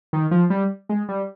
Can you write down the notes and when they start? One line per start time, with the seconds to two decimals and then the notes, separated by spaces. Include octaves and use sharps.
0.13 D#3
0.31 F3
0.50 G3
0.89 G#3
1.09 G3